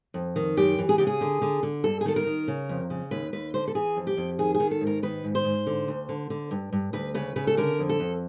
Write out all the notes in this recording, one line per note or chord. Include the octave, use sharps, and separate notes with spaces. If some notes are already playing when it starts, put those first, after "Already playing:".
F2
D#3
F#2 G4
E3
G#4
C#3 G4
G#4
D3
D3
D3
G2 A4
G#4
D#3 A4
A#4
D#3
C#3
F2
C#3
D#2 B4
D#2 B4
D3 C5
A4
E3 G#4
F2
G4
F2
D#3 G#4
G#4
D#3
A4
G#2
A#4
D#3 B4
G#2
C5
G#2
D3
D2
D3
D3
G2
G2
D2 B4
C#3 B4
C#3 B4
A4
D3 A#4
F2
A4
F2